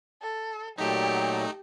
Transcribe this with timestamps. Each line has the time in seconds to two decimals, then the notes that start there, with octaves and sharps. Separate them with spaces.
0.21 A4
0.78 A#2 F#3 A3 D#4 G4 G5 A5